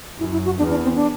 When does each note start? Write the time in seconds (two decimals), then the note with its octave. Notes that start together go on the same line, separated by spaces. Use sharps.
0.19 F#2 E4
0.32 E4
0.45 F#4
0.58 E2 D4
0.70 D4
0.83 C4
0.95 D4